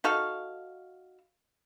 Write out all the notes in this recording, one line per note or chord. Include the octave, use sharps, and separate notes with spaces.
D#4 F#4 A4 F5